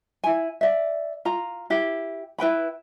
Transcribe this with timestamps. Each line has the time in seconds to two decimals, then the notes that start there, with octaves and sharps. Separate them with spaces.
0.24 E4 G#5
0.61 D5 E5
1.25 F4 A#5
1.70 E4 G4
2.38 E4 B4 G5 B5